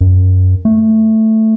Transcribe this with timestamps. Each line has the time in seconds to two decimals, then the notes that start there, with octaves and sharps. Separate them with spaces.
0.01 F#2
0.65 A3